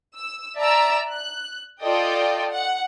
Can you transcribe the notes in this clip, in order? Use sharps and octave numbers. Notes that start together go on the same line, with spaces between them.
E6
D5 E5 A5 A#5 E6
F#6
F4 A4 D5 D#5 G5
F#5